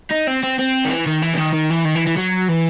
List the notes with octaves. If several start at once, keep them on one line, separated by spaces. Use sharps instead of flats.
D#4
C4
C4
C4
D#3
E3
D#3
E3
C3
D#3
D#3
E3
D#3
E3
E3
F#3
E3